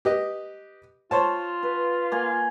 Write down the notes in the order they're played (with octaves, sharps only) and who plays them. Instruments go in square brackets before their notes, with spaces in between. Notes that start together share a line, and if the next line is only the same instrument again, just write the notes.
[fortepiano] G4 B4 D#5
[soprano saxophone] F4 [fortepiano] C5 C#5 A5
[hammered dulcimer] B4
A#3 G#5